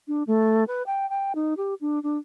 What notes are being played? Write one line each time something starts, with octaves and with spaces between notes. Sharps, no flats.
D4
A3
B4
G5
G5
D#4
G4
D4
D4